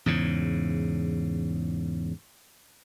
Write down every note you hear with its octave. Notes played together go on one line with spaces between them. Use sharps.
E2 G#2 C#3